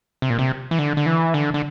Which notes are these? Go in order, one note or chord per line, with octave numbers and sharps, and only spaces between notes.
C3
A#2
C3
E3
D3
D3
E3
D3
D3